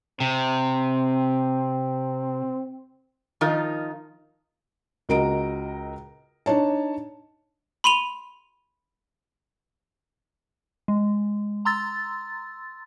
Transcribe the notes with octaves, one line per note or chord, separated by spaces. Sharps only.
C3 C4
D#3 F3 D#4 F4 A#4
C#2 F#4 A#4 D#5 A#5 D7
D4 D#4 C#5 A5
B5 C6 D#7 F7
G#3
A#5 C6 E6 A6